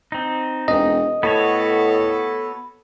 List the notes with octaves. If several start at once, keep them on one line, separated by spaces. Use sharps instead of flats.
C4 D#4
E1 D#5
A2 B3 F#4 A4 C#5